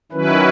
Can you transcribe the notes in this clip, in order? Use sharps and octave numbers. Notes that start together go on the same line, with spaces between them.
D#3 F#3 C#4 E4 B4